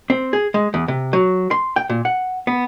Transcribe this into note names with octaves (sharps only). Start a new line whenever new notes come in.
C4
G#4
G#3
E2
C3
F#3
C6
G5
A#2
F#5
B3